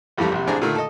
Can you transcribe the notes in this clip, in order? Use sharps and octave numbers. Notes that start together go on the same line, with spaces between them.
A1 F2 E3 G3 A3
A#1 C3
A1 C4 D4 G#4 A#5
A#2 D3 D#3 A3 A#3
A4 D#5